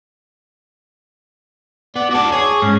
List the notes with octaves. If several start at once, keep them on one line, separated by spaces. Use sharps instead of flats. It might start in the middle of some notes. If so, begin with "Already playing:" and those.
B3 D5
F#4 A4 D6
G#4 C#5
G#2 C#4